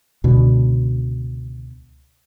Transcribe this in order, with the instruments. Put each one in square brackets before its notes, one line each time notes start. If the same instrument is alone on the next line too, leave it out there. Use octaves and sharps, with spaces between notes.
[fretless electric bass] C#2 B2 D3